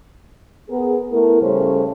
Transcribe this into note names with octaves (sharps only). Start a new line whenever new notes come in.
B3 G#4 A#4
A3 B3 E4 A#4
A2 C#3 G3 C#4 A4 C5